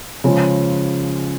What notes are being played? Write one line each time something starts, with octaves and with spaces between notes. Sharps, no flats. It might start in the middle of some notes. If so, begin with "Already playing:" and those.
C#3 F3 G#3